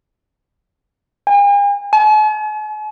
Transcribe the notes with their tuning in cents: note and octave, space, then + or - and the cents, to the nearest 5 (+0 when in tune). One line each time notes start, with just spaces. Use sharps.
G#5 -45
G#5 +45